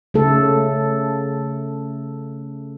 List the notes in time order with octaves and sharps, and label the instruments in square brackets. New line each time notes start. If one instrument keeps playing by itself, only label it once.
[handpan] C#3 A3 A4